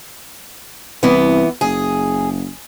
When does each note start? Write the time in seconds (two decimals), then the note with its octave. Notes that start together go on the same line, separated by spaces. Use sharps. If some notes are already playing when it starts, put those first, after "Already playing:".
1.03 C2 E3 B3
1.61 F#1 G#4